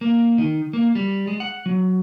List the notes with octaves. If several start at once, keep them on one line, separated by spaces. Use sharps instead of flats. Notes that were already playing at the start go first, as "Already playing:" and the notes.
A#3
D#3
A#3
G3
G#3
F#5
F#3